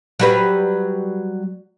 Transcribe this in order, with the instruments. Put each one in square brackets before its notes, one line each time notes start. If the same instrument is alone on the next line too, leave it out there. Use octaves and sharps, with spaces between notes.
[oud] F#3 G3 B4